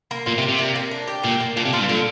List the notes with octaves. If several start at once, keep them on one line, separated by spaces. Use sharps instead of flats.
A#3
A#2 F4
C3
D5
C3
A#3
A#3
D4
G4
A#2 A#3
A#3
A#2 D4
C3
A#2 F4
G2
A#2 D3